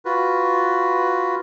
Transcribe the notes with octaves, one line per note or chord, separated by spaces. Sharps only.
F4 F#4 B4